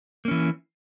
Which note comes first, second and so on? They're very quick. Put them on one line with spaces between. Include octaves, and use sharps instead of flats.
A#3 C#4 E3